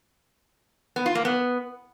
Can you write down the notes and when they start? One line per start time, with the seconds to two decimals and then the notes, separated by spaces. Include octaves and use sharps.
0.96 B3
1.06 F4
1.15 A#3
1.25 B3